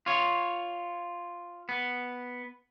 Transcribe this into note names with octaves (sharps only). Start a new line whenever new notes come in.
F4 C#5
B3